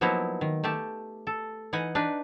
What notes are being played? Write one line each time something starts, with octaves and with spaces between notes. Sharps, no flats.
F3 F#3 A#3 B3 D#4 E4
D#3
A3 G4 A5
A4
E3 D#4 F#5 G#5
D4 D#4 B4